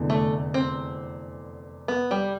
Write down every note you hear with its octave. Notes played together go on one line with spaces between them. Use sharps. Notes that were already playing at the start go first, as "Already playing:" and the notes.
Already playing: F1 E2 D3
A3
C4
B3
G3